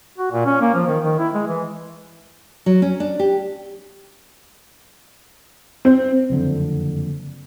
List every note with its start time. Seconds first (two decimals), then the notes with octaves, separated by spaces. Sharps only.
0.18 F#4
0.31 A#2
0.45 C#4
0.61 A#3
0.74 F3
0.87 D#3
1.04 D#3
1.19 E4
1.34 G#3
1.47 E3
2.66 F#3
2.82 C#4
3.00 D4
3.19 G4
5.85 C4
6.30 F#1 F2 D3